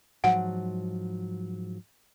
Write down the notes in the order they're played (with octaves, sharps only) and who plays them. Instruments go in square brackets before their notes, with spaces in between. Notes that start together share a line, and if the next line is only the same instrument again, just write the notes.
[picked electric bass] G#2 F3 F#3 [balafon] F#5